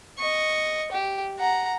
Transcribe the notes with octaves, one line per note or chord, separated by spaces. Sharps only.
D#5 C#6
G4
F#5 A#5